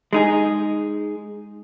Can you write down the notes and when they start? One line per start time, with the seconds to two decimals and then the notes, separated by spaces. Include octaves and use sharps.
0.13 G#3 D#4 G#4